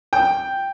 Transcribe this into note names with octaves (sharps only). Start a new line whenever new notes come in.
G5